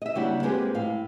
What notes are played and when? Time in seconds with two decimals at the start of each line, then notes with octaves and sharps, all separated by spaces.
0.02 D#5 E5
0.15 C#3 G3 A#3 D4 E4 F#4
0.43 F3 G#3 A#3 C4 G4 B4
0.75 A2 F5